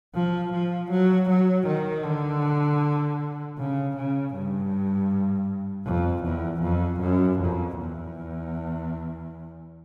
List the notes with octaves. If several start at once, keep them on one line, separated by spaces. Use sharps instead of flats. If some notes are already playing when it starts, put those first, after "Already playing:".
F3
F3
F#3
F#3
D#3
D3
C#3
C#3
G2
F2
E2
F2
F#2
F2
E2